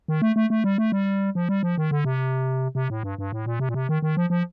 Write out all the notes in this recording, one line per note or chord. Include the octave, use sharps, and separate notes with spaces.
D#3
A3
A3
A3
G3
A3
G3
F3
G3
F3
D#3
D3
C3
C3
A2
G2
G2
A2
A#2
C3
A#2
C3
D#3
D#3
F3
F3